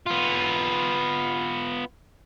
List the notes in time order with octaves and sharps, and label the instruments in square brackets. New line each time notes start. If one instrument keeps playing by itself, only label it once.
[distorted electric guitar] B3 F4